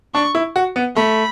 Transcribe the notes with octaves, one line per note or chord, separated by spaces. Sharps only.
D4 C#6
E4
F#4
B3
A3 B5